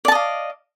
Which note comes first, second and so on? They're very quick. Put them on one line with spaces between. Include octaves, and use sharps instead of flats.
D5 A5 D#5 F5